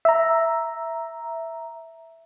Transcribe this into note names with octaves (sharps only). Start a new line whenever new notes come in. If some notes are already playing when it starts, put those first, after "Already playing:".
E5 A#5